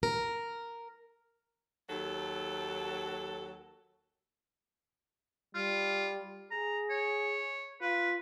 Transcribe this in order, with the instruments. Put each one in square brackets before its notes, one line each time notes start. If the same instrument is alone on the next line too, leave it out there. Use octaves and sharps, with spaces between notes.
[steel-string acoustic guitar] A#4
[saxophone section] D#2 F#3 A4
[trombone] G3 [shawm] F4
[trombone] G#4 [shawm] A#5
[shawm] C#5
[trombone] F4 [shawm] B4